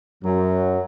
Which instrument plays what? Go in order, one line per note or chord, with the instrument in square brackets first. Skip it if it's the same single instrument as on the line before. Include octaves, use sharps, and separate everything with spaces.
[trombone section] F#2 [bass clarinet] F#3